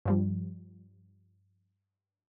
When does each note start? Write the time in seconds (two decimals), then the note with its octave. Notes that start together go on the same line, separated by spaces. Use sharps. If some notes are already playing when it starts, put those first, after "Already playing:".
0.05 G2 F3 G3